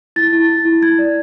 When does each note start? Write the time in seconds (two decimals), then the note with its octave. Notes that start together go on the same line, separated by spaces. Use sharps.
0.16 E4 A6
0.33 E4
0.49 E4
0.65 E4
0.82 E4 G#6
0.99 D5